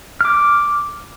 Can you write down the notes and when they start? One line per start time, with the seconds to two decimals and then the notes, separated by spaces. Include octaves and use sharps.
0.21 D6 F6